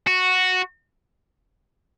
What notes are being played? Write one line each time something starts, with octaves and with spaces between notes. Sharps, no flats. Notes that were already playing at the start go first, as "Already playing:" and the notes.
F#4